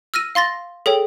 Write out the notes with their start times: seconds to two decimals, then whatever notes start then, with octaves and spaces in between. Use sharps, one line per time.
0.14 E6 F6 A#6 D#7
0.35 F5 C6 A6 A#6
0.86 G#4 A4 C#5 G5